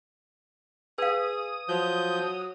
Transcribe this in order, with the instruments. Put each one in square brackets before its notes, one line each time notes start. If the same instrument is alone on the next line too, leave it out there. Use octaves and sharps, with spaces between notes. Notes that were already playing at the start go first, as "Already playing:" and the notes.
[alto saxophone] G#4 [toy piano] B4 F5 [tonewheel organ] D#6
[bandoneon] F3 G6 [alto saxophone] F#3